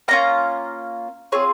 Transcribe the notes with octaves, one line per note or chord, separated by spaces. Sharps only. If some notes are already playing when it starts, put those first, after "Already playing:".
A#3 C#4 F4 A#5
C4 F4 G#4 C#5